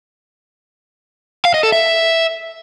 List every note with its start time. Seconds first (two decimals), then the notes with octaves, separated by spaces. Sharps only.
1.45 F5
1.54 D#5
1.63 A4
1.72 E5